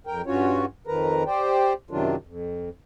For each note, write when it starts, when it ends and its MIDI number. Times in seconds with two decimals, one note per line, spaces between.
0.07 0.22 41
0.07 0.22 70
0.07 0.22 79
0.26 0.65 43
0.26 0.65 61
0.26 0.65 65
0.26 0.65 66
0.26 0.65 73
0.87 1.23 41
0.87 1.23 51
0.87 1.23 53
0.87 1.23 70
0.87 1.23 71
0.87 1.23 82
1.26 1.73 67
1.26 1.73 72
1.26 1.73 74
1.26 1.73 79
1.91 2.16 42
1.91 2.16 48
1.91 2.16 51
1.91 2.16 54
1.91 2.16 62
1.91 2.16 65
2.27 2.69 41